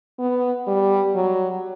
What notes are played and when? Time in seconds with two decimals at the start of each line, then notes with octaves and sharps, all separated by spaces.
0.19 B3
0.67 G3
1.15 F#3